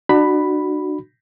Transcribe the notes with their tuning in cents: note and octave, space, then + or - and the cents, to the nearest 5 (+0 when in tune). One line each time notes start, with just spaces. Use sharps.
D4 +35 F#4 +0 B5 +0